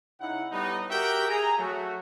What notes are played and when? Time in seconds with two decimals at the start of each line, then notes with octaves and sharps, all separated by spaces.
0.21 C#3 D#4 E4 F#5
0.51 A2 G3 B3 D#4
0.90 F#4 G4 A#4 E5 F#5 G5
1.29 G#4 A#5
1.58 F#3 A3 F#4